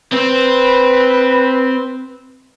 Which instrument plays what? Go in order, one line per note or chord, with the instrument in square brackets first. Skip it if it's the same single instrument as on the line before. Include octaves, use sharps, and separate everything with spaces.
[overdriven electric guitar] C4 C5 [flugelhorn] B4